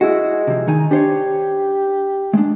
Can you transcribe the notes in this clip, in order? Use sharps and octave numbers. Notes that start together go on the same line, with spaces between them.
G#3 E4 F#4
C3 F3
D#3 D#4 G#5
D4 G4 C5 C#5
G#3 D4